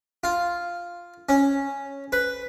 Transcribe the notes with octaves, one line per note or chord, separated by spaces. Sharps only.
F4
C#4
B4